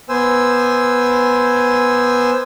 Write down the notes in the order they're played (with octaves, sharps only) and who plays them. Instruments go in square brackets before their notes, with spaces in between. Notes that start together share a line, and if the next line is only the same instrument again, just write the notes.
[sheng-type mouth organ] B3 C5 G#5 E6